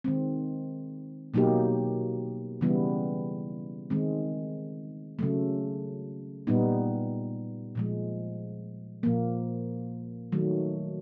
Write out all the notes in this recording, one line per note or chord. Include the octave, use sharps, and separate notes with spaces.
D#3 G#3 C4
B2 F#3 A#3 D#4 G4
C#3 E3 G3 B3 E4
D#3 G#3 C4
C#3 F#3 A3
A#2 G3 B3 D#4
A#2 F3 G#3
A#2 F3 A#3
D#3 F#3 A3